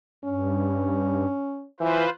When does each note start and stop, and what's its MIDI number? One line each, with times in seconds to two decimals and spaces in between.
0.25 1.26 43
0.25 1.65 61
1.80 2.03 52
1.80 2.10 65
1.80 2.10 71
1.80 2.10 72